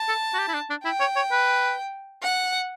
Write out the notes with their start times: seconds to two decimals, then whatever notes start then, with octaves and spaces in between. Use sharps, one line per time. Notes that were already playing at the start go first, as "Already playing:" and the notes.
Already playing: A5
0.08 A4
0.34 F#4
0.39 G4
0.48 E4
0.54 D4
0.70 D4
0.85 E4 G5
1.00 C#5
1.16 C#5
1.31 B4
2.23 F#5